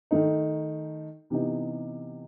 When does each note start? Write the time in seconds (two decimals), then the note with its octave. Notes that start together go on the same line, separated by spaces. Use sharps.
0.11 D#3 A3 D#4
1.30 C3 E3 B3 D#4